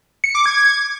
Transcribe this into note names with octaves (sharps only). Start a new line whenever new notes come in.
C#7
D6
G#6